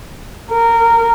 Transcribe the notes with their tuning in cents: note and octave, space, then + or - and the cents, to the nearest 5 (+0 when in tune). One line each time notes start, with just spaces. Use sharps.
A#4 -15